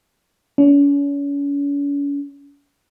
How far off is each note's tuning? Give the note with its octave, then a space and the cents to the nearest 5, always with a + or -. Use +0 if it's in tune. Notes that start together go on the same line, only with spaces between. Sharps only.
C#4 +40